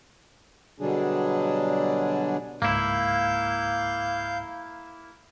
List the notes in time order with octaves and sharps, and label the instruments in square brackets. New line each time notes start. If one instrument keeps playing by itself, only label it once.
[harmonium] B2 D3 F#3 G3 D4 G#4
[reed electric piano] C#2 G#2 [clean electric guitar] A#3 E4 [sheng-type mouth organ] F5 G6